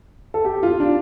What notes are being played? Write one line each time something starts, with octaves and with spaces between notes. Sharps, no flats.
A4
G4
F4
D4